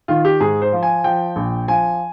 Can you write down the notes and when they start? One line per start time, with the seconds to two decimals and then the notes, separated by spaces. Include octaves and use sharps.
0.08 D#3 F4
0.25 G4
0.40 G#2 G#4
0.62 C5
0.72 F3
0.83 G#5
1.04 F3 G5
1.36 A#1
1.68 F3 G#5